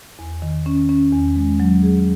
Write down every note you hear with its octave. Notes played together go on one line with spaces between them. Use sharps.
E2
D#3
C#4
C#4
E2
G#3
F#3
G#4